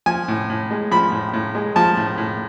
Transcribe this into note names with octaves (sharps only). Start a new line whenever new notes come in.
F3 G#5
A2
A2
G#3
F3 B5
A2
A2
G#3
F3 A5
A2
A2